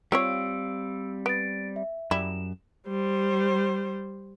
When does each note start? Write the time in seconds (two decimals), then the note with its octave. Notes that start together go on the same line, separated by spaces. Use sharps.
0.12 G3 C4 F4 G4 C#5 F5 E6 D7
1.26 B3 A6 D7
1.76 E5
2.11 F#2 G3 E4 E7
2.87 G3 C5